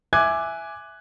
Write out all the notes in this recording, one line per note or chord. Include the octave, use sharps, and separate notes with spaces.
E5 G#5 D6 F#6 G#6